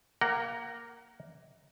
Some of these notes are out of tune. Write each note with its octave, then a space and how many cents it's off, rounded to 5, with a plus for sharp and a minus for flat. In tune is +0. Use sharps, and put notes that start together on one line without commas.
A#3 +5 F#5 +35 A#5 +0